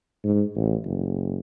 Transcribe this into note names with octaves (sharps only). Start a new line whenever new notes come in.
G#2
A1
F#1